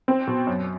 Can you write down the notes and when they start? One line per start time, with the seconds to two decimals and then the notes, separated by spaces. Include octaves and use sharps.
0.08 C4
0.27 B2
0.47 F#2